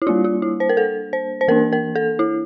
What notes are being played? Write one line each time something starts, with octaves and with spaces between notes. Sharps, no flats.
E4
G3 A#3 D4 F4
F4
E4
C5
A#4
A4
C5
C5
E3 A#3 D4 A#4
A#4
A4
E4